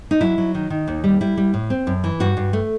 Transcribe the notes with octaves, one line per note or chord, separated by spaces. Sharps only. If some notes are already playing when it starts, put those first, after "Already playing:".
D#4
F#3 E4
F#3
D#3
D#3
D#2
G3
G3 E4
G3
A2
C4
F#2
E3
G2 F#4
G2
A3